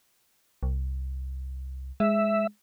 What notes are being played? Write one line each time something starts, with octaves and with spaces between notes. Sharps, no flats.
C2
G#3 E5